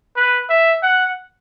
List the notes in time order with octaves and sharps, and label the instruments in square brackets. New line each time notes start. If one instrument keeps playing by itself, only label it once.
[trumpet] B4
E5
F#5